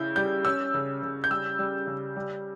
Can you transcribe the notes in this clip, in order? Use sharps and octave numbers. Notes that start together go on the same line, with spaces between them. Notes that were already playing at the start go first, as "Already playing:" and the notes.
Already playing: C#3 E4 G6
G3 G6
C#4 E6
C#3
C#3
G6
G3 E6
G3
C#3
G3